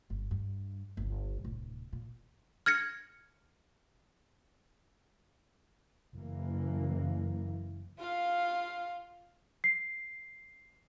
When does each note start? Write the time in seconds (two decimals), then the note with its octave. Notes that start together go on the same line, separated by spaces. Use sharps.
0.10 G1
0.31 G2
0.97 G1 C#2
1.44 D1 C2
1.93 A#2
2.66 F6 G#6 A#6 C#7
6.14 F#1 E3 A#3
7.99 F4 F5
9.64 C7